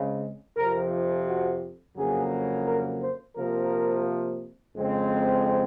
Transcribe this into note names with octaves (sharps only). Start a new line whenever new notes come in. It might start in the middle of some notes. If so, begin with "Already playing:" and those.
Already playing: C#3 G#3 C4
F2 C3 F3 A#4
F#4
F2 C#3 F#3 A#3 G#4
A#4
C5
C3 F3 A#3 A#4
F2 C#3 G#3 C4